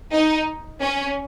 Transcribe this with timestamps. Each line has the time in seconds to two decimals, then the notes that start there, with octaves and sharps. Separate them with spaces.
0.12 D#4
0.80 C#4